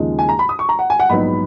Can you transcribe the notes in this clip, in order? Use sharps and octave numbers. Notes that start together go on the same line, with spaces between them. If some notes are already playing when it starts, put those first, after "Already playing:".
Already playing: D#2 C#3 F3 G#3 D#4
G#5
A#5
B5
D#6
C#6
A#5
F#5
G#5
F#5
A#1 G#2 F#3 B3 D#4 B5